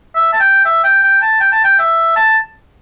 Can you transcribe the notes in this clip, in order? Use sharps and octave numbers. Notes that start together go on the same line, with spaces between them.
E5
A5
G5
E5
G5
G5
A5
G5
A5
G5
E5
A5